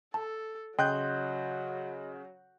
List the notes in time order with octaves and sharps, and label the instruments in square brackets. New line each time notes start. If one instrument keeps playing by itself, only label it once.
[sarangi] A4 [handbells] A5
[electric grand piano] C#3 F#6 G6 [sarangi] F#3 [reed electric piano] D#5 C6 [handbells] G5